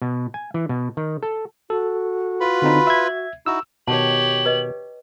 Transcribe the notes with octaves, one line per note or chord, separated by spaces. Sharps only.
B2
G#5
E3
B2
D#3
A4
F#4 A4
F4 B4 B5
D3 C4 D#4
E5 G#6
D#4 E4 F#4 E6
B2 D#3 G4 C#5 F#5 A5 F#7
B4 D#5